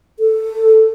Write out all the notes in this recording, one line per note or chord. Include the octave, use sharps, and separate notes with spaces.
A4